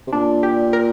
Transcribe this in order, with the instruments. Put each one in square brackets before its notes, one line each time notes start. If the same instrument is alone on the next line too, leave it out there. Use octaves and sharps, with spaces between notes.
[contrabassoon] C3
[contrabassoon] A#2 [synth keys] D4
[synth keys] G4
A#4